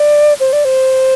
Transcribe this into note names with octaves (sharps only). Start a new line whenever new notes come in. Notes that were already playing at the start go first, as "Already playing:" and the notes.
Already playing: D5
C5
D5
C5